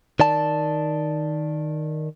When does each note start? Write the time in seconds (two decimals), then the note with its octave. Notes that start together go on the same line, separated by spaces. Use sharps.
0.20 D#3 D5 A5